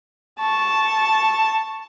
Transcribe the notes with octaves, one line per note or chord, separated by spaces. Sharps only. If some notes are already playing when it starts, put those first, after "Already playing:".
A5 C#6